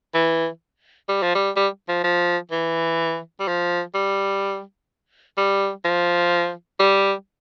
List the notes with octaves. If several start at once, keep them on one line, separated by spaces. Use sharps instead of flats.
E3
G3
F3
G3
G3
F3
F3
E3
G3
F3
G3
G3
F3
G3